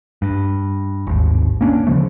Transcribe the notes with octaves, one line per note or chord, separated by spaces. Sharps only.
G2
G#1 D#2
A#3 C#4 D4
D2 C#3 F3 A3